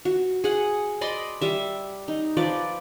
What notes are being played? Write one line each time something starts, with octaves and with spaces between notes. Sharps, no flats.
F#4
G#4 F#5
D5 D#5 B5 C6
G3 E5
D#4
F3 B4 D5